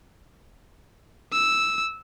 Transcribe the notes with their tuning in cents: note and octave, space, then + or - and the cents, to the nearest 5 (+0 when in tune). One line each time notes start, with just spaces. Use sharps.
E6 -5